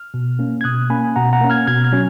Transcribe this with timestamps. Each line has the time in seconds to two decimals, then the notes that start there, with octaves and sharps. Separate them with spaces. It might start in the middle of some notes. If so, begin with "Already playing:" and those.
Already playing: F6
0.14 B2
0.39 A#3 C#4
0.61 G#6
0.64 B2 D#6 F#6
0.90 A#3 C#4 G#5 B5
1.16 B2 F#5 A#5
1.33 F#5 A#5
1.41 A#3 C#4
1.50 F6 G#6
1.67 B2 F6 G#6
1.84 F6 G#6
1.92 F#3 C#4